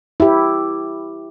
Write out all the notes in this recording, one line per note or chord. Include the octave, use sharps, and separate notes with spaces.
E4 G4